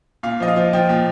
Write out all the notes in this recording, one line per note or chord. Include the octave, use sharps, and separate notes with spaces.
A#2 F5
F3 D#5
F5
F3
F3 G5
A#2